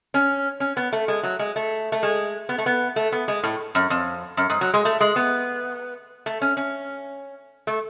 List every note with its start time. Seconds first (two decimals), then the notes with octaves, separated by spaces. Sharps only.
0.14 C#4
0.60 C#4
0.77 B3
0.93 A3
1.08 G#3
1.23 F#3
1.39 G#3
1.56 A3
1.92 A3
2.03 G#3
2.49 B3
2.58 A3
2.66 B3
2.96 A3
3.12 B3
3.28 G#3
3.43 A2
3.75 F#2
3.90 F2
4.37 F#2
4.50 G#2
4.61 F#3
4.74 G#3
4.85 A3
5.01 G#3
5.16 B3
6.26 A3
6.41 C#4
6.57 C#4
7.67 A3